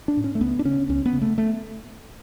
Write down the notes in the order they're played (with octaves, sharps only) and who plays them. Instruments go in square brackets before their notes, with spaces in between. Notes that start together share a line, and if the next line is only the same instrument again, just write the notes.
[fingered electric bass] D4
A2
C#4
A3
C#2 B3
D4
C#3 C#4
C#2 C#4
B3
C#3
A3
A3